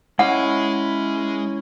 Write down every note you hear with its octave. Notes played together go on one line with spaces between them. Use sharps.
G#3 C#4 E4 D#5 F#5